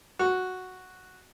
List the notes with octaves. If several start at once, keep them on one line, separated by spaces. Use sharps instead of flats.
F#4